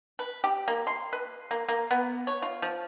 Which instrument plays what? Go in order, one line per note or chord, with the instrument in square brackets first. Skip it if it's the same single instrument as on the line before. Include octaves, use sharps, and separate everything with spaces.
[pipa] B4
G4
A#3
C6
B4
A#3
A#3
B3
C#5
F4
F3